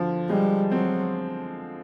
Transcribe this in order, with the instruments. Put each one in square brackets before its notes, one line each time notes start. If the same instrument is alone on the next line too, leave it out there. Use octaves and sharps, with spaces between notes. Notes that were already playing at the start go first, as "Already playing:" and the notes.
Already playing: [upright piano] D3 F3
[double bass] G3 [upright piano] G#3
[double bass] F#3 [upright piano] C4